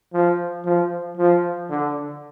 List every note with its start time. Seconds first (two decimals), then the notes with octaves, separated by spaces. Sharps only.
0.13 F3
0.65 F3
1.17 F3
1.70 D3